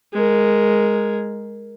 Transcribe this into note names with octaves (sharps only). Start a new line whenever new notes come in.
G#3 A#4